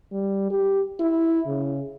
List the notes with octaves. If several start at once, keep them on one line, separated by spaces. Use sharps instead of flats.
G3
G4
E4
C#3